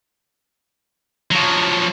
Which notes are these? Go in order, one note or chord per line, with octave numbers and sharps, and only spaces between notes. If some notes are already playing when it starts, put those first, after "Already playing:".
F3 F#3